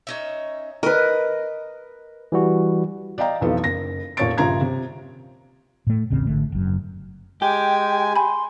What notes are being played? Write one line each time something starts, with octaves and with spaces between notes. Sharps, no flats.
C#4 D#4 E5
A#4 B4 D#5
E3 G3 F#4
D5 D#5 F5 G5 A#5
F1 B1 E3 F3 A4 B4
F#1 A#6
F1 A#2 C#5 C#6 A6 D7
A#1 G2 C#3 F4 A#5 G#6
C3
A2 A3
D#1 A1 C#3 C4
G#1 D3 A3
F#1 F#2
G#3 G4 G5 G#5
G#5 B5 C6